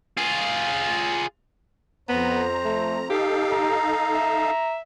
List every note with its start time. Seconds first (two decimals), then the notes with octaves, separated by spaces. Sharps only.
0.18 F4 G#4
2.09 F2 B3 C5 A#5
2.65 A3
3.10 D#4 G4 A4 F5
3.53 A#5
4.14 E5